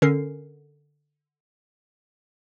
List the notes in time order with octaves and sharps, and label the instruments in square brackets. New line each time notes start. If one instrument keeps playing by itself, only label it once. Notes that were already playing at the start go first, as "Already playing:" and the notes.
[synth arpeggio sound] D3 C#4 A#4 C7